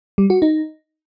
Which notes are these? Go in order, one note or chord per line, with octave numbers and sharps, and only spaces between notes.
G3
F#4
D#4